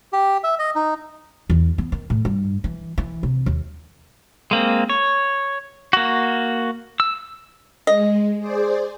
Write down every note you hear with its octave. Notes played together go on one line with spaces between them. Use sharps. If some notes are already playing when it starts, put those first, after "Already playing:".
G4
E5
D#5
D#4
E2
B3
D#3
A2
G2
E3
E3
C3
D#2
G#3 A#3 C4
C#5
A#3 F#4
E6
G#3 D#5
G#4 C5 D5